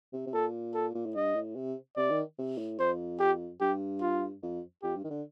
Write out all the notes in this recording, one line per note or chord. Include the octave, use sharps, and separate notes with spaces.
C3
C3
A#2 A4
A4
A#2
A2
G2 D#5
A2
C3
C3 D5
D#3
C3
A2
F2 C5
G4
G2 G4
F4
F2
F2 G4
G2
D#3
D3